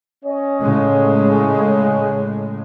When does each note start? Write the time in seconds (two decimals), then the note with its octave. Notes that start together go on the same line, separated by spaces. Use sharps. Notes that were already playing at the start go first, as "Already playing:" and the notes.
0.25 C#4 C#5 D#5
0.60 A2 C#3 G#3